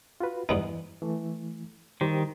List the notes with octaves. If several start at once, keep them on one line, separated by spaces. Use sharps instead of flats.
F4 F#4 B4
G2 E3 B3 D#4
E3 A3
D#3 G3 G4 C5